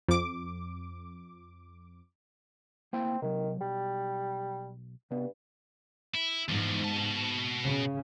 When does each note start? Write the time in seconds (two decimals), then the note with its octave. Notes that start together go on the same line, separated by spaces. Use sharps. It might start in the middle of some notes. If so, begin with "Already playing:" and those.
0.08 F2 D6
2.93 A#3 C4 E4 G5
3.22 C3 D#3 F#3
3.61 B1 G3
5.11 G2 C3 B3
6.15 E4
6.48 E2 G#2 F3
6.84 B2 A5
7.62 C#3